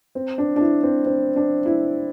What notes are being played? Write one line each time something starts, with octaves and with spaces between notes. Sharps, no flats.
C4
D4
D4
E4
C4
C4
D4
E4